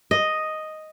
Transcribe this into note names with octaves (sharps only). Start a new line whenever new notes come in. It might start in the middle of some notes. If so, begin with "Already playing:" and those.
D#5